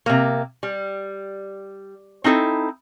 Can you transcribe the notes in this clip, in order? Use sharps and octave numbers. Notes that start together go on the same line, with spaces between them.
C3 A#3
G3
C4 D#4 E4 A4